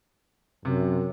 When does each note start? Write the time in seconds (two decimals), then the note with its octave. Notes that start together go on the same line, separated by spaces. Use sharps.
0.65 F#2 C3